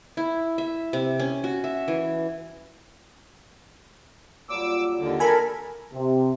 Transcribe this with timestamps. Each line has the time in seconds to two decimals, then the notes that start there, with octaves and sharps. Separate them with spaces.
0.17 E4
0.58 E5
0.93 C3
1.19 C#4
1.44 F#4
1.64 E5
1.88 E3
4.49 A#2 F#3 G3 D6 E6
4.99 D#2 D3
5.20 A#3 D4 A4 A#4 G#5 B5
5.93 C3